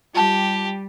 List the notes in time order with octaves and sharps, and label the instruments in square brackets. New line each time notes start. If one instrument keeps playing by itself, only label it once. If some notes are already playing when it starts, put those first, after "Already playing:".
[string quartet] G3 [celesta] F4 A5 [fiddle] G4